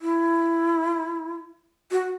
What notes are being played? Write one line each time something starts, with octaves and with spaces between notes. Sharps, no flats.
E4
F#4